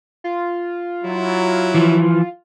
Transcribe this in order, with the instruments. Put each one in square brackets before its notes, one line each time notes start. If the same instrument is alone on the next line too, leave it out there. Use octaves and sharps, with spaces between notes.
[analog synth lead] F4
[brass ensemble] F#3 E4
[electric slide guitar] E3 F3